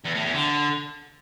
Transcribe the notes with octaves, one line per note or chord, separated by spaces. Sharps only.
E2
A2
E2
D3